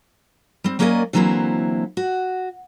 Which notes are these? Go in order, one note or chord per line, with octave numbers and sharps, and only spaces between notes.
G3 C4
F#3 A#3 C#4 A#4 D5 D#5
D3 E3 F#3 A#3 C4 E4
F#4